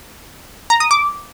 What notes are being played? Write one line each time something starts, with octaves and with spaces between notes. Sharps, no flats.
A#5
D#6
D6